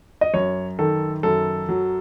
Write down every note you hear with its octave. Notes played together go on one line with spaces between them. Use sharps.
D#5
F#2 C#5
D#3 A4
F#2 A4
F#3